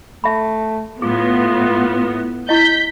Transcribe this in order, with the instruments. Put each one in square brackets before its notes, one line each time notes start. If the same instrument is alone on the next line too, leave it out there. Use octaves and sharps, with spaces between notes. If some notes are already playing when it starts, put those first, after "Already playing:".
[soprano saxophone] A3 [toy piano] E5 B5
[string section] A2 B3 [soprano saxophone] F4 [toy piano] G#4
[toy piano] E4 D#5 [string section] G6 B6